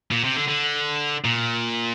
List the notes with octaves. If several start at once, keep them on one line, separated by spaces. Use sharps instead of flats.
A#2
C3
D3
D3
A#2